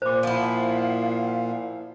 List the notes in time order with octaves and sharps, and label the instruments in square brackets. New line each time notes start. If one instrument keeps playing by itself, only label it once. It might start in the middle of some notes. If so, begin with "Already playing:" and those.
[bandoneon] A#2 [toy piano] C5 D6
[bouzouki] F3 E4 [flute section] F5 F#5